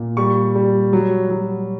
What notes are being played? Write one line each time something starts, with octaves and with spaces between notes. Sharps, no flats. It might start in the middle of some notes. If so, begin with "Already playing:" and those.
Already playing: A#2
G3 C#6
G3
F#3
F#3